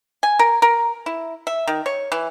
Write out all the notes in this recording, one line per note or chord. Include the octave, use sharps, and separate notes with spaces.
G#5
A#4
A#4
E4
E5
D#3
C#5
E3